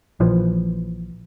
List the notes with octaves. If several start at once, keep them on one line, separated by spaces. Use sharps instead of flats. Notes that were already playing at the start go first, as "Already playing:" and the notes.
A#1 E3 F3